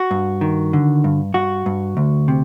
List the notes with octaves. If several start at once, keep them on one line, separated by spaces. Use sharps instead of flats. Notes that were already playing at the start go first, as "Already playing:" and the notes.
Already playing: F#4
G2
D#3
D3
G2
G2 F#4
G2
D2
C3